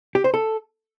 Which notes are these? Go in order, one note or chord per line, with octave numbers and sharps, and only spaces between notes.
G4
C5
A4